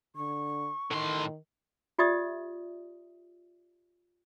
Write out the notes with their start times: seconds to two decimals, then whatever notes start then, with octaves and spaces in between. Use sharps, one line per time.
0.16 D3 C#6
0.91 A2 D#3 C6
1.99 F4 G4 D5 E5 D#6